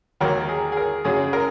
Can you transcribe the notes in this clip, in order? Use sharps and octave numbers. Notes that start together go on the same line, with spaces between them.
D#2 D#3 F#3 A#4
G#4
G#4
A#4
F#2 C#3 F#3 G#4
A#4